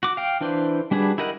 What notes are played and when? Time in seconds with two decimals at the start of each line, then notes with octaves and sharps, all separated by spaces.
0.03 F#4 D6
0.17 F5 G5
0.41 E3 D4 B4 C5
0.91 G3 D4 F#4 G#4 B4
1.18 E4 G4 A#4 D#5 F#5